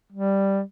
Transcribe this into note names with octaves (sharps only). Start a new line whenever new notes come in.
G3